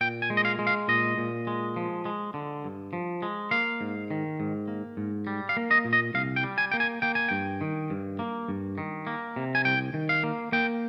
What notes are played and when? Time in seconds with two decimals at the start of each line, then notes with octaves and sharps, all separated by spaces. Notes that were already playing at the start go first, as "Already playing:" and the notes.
0.01 A#2 G5
0.22 G#5
0.30 G#3
0.37 D#5
0.45 F5
0.59 G#3
0.67 F5
0.88 A#2 D#5
1.18 A#2
1.47 G#3
1.76 F3
2.05 G#3
2.34 D3
2.64 G2
2.93 F3
3.22 G#3
3.51 A#3 F5
3.81 G#2
4.11 D#3
4.40 G#2
4.68 A#3
4.97 G#2
5.27 G3
5.49 F5
5.57 A#3
5.71 D#5
5.85 A#2
5.93 D#5
6.14 C2 F5
6.36 G5
6.44 G3
6.58 G#5
6.72 A#3 G5
6.80 G#5
7.02 A#3 G5
7.15 G#5
7.29 G2 G5
7.61 D#3
7.90 G2
8.19 A#3
8.48 G2
8.78 D#3
9.07 A#3
9.36 C3
9.55 G#5
9.65 C2 G5
9.94 D#3
10.09 F5
10.23 A#3
10.52 A#3 G5